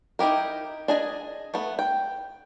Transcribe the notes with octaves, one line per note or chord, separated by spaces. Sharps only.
D#4 E4 G4 A#4
D4 G#4 D#5 G#5
A3 B3
G5